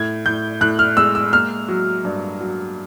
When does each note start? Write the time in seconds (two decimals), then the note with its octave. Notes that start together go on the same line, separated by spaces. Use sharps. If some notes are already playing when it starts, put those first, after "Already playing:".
Already playing: A2 G#6
0.26 A2 G6
0.61 A2 F#6
0.79 F6
0.97 G#3 E6
1.15 E6
1.33 A#3 F6
1.68 F#3
2.05 G2
2.40 F#3